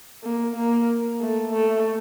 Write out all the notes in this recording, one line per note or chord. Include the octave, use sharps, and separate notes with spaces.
A#3
A#3
A3
A3